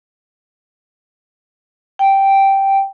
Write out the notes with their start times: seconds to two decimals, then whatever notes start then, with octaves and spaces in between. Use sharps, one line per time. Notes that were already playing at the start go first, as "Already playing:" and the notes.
1.99 G5